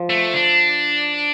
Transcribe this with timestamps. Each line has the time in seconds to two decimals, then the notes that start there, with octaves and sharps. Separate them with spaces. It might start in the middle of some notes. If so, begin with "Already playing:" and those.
Already playing: F3
0.10 A3
0.34 D4